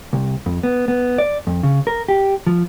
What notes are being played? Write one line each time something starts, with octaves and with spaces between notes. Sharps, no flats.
C2
F2
B3
B3
D5
F2
C#3
A#4
G4
F3